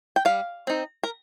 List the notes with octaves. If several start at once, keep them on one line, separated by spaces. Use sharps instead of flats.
G5
G3 F5
C4 D#4
A#4